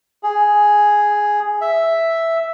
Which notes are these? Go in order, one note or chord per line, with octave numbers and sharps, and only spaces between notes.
G#4
E5